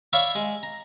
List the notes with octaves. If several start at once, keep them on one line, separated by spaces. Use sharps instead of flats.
C#5 D5 E5 F5 B5
G#3
A#5